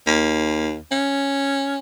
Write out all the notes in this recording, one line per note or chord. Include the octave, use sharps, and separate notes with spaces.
D#2
C#4